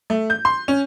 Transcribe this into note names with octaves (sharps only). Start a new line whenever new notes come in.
A3
G6
C6
C#4